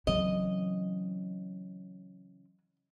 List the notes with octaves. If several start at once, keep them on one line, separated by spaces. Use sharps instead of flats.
C#3 E3 F#3 C4 D#5